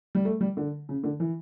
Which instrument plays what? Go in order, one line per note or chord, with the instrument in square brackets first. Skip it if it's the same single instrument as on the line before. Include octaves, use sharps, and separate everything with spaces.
[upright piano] G3
A3
G3
D3
C#3
D3
E3